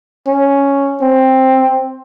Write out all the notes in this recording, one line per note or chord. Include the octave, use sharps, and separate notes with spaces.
C#4
C4